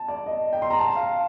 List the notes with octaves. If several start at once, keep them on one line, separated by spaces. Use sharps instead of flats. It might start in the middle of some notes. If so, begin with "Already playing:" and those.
Already playing: A5
D5
D#5
G5
C6
A#5
A5
F5